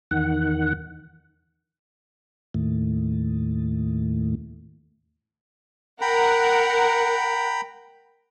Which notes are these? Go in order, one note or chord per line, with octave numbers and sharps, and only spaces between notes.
E2 D#3 F#5
D#2 A2
A#4 F#5 G5 A#5 B5